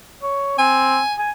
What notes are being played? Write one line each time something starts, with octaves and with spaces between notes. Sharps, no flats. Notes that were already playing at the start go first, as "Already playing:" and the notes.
C#5
C4 G#5
G#5